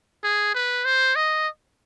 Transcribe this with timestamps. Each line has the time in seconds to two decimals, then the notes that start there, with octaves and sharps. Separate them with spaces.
0.24 G#4
0.54 B4
0.85 C5
1.16 D#5